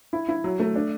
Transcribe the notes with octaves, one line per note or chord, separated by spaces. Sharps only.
E4
E4
F#3
A3
D4